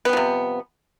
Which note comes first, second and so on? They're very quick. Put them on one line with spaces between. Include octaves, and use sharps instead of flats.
B3 G3 F3 C3